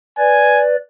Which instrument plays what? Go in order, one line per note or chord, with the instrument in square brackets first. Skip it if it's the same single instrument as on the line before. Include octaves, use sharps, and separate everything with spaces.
[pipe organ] B4 D5 [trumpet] G#5